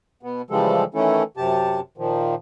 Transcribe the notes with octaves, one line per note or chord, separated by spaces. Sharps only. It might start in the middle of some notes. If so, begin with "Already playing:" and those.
B2 B3
C#3 E3 F3 G3 G#3 A4
D#3 E3 A3 C#4 E4 A4
F#2 C3 G4 A5
A#2 D#3 F3